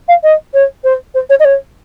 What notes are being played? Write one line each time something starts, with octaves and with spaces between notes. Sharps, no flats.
F5
D#5
C#5
C5
C5
C#5
D#5
C#5